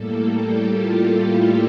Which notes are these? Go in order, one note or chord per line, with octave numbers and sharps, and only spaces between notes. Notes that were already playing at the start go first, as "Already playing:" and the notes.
Already playing: A2 G3 A#3 A4
G4
F4
E4